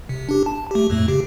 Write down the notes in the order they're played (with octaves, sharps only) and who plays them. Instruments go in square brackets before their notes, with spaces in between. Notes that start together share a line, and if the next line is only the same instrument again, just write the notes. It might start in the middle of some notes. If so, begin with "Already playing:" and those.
[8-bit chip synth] C3
D4 G4
A5
A3 G4
F2 A2 A3
C#3 G4